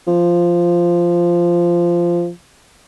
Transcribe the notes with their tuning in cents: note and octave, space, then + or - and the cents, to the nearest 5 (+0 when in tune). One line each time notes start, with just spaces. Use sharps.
F3 -10